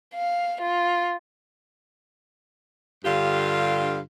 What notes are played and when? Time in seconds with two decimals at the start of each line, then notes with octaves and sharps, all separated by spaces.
0.14 F5
0.62 F4
3.05 G2 D3 F4 G4 F5